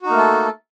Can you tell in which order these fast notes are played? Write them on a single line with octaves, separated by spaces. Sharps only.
F#4 D#4 A#3 A3 A4